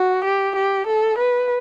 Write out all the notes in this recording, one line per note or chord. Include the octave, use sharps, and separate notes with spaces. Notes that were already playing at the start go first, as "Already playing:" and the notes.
Already playing: F#4
G4
G4
A4
B4